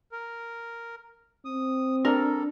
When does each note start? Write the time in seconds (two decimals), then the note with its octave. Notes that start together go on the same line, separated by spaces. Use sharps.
0.12 A#4
1.45 C4 D#6
2.05 G3 D4 A4 A#4